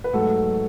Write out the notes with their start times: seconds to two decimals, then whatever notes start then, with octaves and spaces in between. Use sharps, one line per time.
0.04 B4
0.13 G#2 F#3 A3 F#4 A4